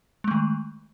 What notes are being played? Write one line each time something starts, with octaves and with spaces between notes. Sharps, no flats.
D#3 G#3 A3